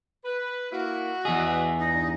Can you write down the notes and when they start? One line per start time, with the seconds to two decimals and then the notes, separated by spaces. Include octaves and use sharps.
0.25 B4
0.72 A#3 E4 F#4
1.25 E2 G#4 D#5 E5
1.79 G2 D#4